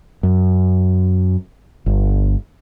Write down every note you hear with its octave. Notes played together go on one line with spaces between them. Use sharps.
F#2
G1